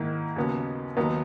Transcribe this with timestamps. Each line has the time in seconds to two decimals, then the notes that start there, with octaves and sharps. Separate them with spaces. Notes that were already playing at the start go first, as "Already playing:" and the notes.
Already playing: G#2 D#3 A#3 E4
0.36 D#2 C#3 F#3 B3
0.97 D#2 D#3 F#3 B3